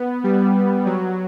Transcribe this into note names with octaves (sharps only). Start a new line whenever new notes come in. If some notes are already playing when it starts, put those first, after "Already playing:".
Already playing: B3
G3
F#3